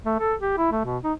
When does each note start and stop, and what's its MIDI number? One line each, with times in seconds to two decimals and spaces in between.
0.06 0.15 57
0.19 0.34 69
0.40 0.56 67
0.57 0.71 64
0.72 0.81 57
0.85 0.98 47
1.04 1.13 63